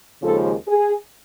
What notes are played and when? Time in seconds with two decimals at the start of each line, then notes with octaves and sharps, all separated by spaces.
0.22 D#2 C#3 F3 G#3 C#4 A4
0.67 G#4